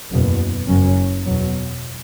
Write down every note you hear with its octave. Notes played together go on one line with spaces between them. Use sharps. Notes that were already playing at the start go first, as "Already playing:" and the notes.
F#1 E2 B2 B3
F#1 F#2 F#3 C#4
E2 B2 F#3